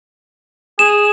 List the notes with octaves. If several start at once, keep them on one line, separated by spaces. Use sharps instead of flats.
G#4 E7